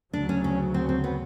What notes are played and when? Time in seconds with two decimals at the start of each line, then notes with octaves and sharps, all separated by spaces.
0.13 D2 C#3 F#3 D4
0.29 C#4
0.44 C#4
0.74 C4
0.89 C4
1.04 B3